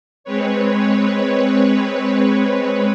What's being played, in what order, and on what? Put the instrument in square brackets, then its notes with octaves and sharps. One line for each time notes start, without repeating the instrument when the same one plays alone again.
[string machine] G#3 C4 B4 C#5